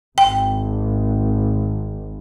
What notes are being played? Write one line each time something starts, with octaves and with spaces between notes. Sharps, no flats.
G#1 G5